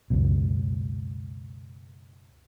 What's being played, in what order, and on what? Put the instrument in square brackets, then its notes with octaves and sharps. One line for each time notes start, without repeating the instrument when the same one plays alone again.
[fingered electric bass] C#2 F#2 B2